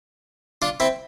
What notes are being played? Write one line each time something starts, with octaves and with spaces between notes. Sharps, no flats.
D4 F4
C4 E4